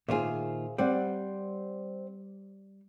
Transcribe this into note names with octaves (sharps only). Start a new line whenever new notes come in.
A#2 D#3 F4 G#4 C5 E5
G3 C4 D5 F#5